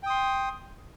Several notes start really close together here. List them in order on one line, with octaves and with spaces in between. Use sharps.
G5 D#6 C6